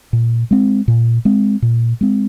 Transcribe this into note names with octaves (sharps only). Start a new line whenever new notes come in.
A#2
G#3 C4
A#2
G#3 C4
A#2
G#3 C4